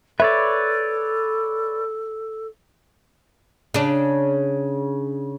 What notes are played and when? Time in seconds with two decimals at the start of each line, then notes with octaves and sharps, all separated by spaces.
0.20 A4 B4 C#5 D5 E5
3.74 C#3 D4